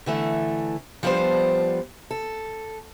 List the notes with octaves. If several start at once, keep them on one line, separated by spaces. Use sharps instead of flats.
D3 E3 A3
F3 G3 B3 D4 C5
A4